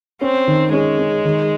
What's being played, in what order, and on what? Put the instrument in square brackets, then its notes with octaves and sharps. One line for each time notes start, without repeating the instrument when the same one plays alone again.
[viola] C4 [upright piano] C#4
[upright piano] D#3
[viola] G#3 [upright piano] C#4
[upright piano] C#4
D#3